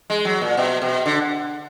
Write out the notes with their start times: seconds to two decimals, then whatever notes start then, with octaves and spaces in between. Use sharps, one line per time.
0.10 G#3
0.25 F#3
0.41 A#2
0.57 B2
0.82 B2
1.06 D3